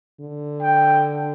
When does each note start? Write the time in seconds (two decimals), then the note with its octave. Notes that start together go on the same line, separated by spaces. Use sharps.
0.20 D3
0.62 G5